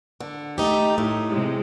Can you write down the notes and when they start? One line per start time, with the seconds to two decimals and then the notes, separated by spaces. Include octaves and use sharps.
0.21 D3
0.58 A3 D#4 G4
0.98 A2
1.30 C3 G#3